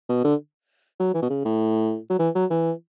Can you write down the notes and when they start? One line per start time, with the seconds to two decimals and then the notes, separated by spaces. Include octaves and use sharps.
0.09 B2
0.24 D3
1.00 F#3
1.14 E3
1.22 B2
1.30 C#3
1.45 A2
2.10 F#3
2.19 E3
2.35 F#3
2.50 E3